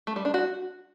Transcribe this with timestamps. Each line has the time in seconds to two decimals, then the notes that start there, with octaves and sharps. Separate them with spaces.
0.07 A3
0.16 G3
0.25 D4
0.34 F#4